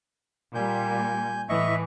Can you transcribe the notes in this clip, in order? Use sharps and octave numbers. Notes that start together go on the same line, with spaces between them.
A#2 G3 G#5 G6
A2 E3 D#5 E5 C#6